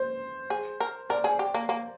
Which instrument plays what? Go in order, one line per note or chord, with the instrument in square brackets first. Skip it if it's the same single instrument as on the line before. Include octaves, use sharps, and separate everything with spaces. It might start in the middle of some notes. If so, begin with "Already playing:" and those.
Already playing: [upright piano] C5
[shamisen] G#4
A#4
[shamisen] A#4 [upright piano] D5
[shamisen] G#4
G4
A#3
A#3